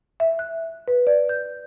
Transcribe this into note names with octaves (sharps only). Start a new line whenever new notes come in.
E5
F#6
B4
D5
G6